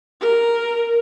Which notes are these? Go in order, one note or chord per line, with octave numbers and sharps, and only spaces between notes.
A#4